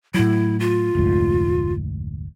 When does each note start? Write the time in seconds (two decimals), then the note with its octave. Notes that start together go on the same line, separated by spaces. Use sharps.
0.14 A2 F#3 E4
0.60 F4
0.95 F1 D2 G#2